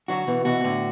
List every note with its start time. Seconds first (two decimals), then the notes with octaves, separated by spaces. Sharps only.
0.08 D3 F#3 F#4
0.27 B2 E3
0.45 B2 E3 F#4
0.60 B2
0.64 A2 D3